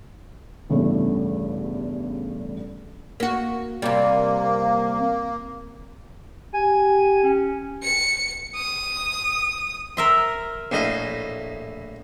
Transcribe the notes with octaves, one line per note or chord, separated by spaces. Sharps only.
A1 E2 G2 C#3 E3 A3
A#3 F#4
C3 G3 A#3
G4 G#5
C#4
C#7
D#6
A#4 E5 C6
A#1 A2 D#5